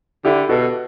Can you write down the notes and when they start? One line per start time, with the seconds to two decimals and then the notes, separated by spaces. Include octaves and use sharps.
0.25 D3 E4 G4
0.49 B2 F#4 A4